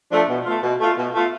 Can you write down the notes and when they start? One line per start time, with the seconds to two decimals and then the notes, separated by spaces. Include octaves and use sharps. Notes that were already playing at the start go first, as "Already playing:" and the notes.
0.11 F3 A3 D4
0.29 B2
0.45 A3 F4
0.62 B2
0.79 A3 F4
0.97 B2
1.14 A3 F4